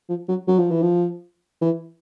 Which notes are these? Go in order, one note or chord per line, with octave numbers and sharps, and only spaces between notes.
F3
F#3
F#3
F3
E3
F3
E3